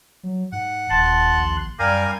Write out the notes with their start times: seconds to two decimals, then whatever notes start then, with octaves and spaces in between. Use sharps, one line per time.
0.23 F#3
0.52 G#2 F#5
0.90 D#1 D#2 A5 C6 F#6
1.37 A#1
1.79 F#2 G3 A#4 D5 F5 G5 G#5 A#5